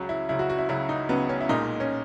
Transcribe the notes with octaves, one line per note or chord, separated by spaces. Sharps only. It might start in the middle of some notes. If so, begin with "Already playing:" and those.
Already playing: C#2 C#3 F#3
E4
C#2 C#3 F#3 E4
F#4
F#4
E4
C#2 C#3 F#3 E4
D#4
C#2 C#3 F#3 B3
C#4
E4
B1 A#2 G#3 D#4
C#4